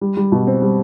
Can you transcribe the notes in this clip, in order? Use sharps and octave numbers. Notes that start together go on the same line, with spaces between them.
G3
G3
B2
C4
G3